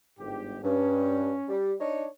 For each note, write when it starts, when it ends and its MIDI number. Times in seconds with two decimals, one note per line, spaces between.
0.20 0.59 31
0.20 0.59 44
0.20 0.59 67
0.64 1.31 43
0.64 1.57 61
1.48 1.73 55
1.80 2.05 62
1.80 2.05 63
1.80 2.05 73